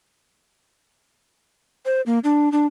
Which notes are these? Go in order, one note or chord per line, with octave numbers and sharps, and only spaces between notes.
C5
A#3
D4
D4